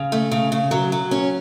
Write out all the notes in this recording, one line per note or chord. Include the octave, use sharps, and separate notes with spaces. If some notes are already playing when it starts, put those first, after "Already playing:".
Already playing: C#3
A3
C#3
C#3
F#3
F#3
C#4